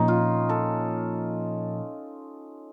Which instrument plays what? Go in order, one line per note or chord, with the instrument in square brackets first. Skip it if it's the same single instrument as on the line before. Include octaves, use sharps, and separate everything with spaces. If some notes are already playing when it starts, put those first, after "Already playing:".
Already playing: [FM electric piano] A#2 F3 A#3 [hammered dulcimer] C#4 D#4
[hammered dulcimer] F4
A4